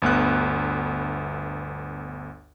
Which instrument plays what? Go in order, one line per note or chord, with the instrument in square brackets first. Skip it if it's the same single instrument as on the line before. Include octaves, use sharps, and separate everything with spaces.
[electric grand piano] G1 D2 B3 F#6